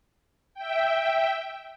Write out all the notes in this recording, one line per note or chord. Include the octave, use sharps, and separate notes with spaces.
E5 G5